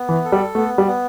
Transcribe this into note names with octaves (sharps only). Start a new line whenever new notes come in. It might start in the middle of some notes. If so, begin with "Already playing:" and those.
Already playing: B3
E3
A4
G3
A3 B3
G3
B3